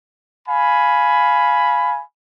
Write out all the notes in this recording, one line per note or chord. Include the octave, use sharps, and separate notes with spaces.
F5 G#5 B5